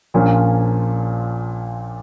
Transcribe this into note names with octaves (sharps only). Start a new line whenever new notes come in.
A#1 A#2 F3 A#3 C#4